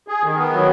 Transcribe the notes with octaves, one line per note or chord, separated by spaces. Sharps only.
G#4
D#3
B3
F#3